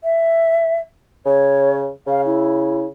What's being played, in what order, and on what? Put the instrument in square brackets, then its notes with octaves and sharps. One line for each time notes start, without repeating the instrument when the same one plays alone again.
[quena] E5
[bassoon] C#3 [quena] C#5
[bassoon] C#3 [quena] F5
[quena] E4